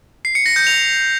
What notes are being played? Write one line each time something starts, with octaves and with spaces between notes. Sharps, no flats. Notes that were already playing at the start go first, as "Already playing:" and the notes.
C7
C#7
A#6
G6
F7